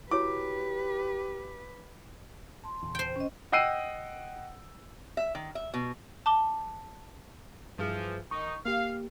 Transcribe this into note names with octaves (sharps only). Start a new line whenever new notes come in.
E4 F#4 G4 B4 C#5 D6
A5 C6
E2 A#2 C#3
C5 G5
C#4 D#5
D#5 F#5 G5 E6 C7 D#7
E5
D#3
E5
B2
A5 D6 G7
G2 E3 F3 G#4
D#3 D#4 C#6
A#3 G4 F5